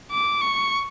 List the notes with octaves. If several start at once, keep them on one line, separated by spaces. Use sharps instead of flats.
D6
C#6